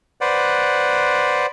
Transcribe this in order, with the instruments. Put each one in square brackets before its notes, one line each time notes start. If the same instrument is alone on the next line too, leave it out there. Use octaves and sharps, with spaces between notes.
[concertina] B4 C5 D5 F#5